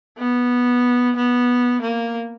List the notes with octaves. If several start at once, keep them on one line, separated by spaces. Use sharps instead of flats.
B3
B3
A#3